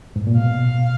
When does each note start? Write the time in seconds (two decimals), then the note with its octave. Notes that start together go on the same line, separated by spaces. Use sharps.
0.16 G#2
0.27 A#2
0.37 B2 F5